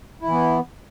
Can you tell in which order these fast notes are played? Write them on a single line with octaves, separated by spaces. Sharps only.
E4 E3 B3